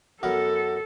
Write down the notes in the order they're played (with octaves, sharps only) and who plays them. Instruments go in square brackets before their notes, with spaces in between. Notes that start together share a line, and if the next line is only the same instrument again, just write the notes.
[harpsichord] F#2 B3 A#4 [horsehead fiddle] A4